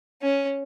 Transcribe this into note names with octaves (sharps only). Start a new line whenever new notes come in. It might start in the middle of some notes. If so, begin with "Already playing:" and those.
C#4